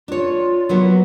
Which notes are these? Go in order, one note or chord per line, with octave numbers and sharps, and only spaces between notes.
D4 F4 C#5
F#3 A#3 B3